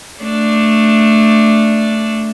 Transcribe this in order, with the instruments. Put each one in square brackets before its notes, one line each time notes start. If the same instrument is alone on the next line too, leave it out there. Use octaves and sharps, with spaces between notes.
[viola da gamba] A3 D4